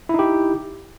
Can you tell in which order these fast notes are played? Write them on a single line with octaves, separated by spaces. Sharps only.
E4 D#4 G4